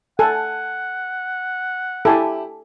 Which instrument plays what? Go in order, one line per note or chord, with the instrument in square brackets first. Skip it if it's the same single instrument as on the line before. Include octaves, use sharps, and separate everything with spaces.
[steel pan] A4 [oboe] F#5 [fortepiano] G#5
[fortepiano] E4 G4 [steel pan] A4 G#5 D6